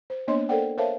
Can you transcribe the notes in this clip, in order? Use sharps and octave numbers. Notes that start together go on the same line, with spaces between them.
C5
A#3 B3 D4 C#5 D#5 C6
A4 A#4 C5 D5 F#5 G5
A#4 C5 C#5 E5 F5 A5